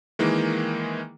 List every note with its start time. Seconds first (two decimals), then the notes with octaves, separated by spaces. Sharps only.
0.19 D#3 E3 G#3 A#3